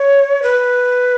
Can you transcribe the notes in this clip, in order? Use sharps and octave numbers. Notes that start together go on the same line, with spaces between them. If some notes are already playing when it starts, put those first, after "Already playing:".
Already playing: C#5
B4